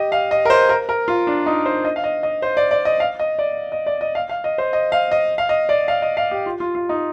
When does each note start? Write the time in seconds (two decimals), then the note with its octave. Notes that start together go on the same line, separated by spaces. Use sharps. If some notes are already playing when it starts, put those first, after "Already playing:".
Already playing: G4 D#5
0.12 F5
0.31 D#5
0.45 A#4
0.50 C5
0.69 A#4
0.89 A#4
1.08 F4
1.27 D4
1.46 D#4
1.66 C5
1.85 D#5
1.96 F5
2.04 D#5
2.23 D#5
2.42 C5
2.57 D5
2.71 D5
2.85 D#5
3.00 F5
3.20 D#5
3.39 D5
3.72 D#5
3.86 D5
4.01 D#5
4.15 F5
4.29 F5
4.44 D#5
4.58 C5
4.73 D#5
4.92 F5
5.12 D#5
5.38 F5
5.49 D#5
5.69 D5
5.88 F5
6.02 D#5
6.17 F5
6.31 G4
6.46 F4
6.60 F4
6.75 F4
6.89 D#4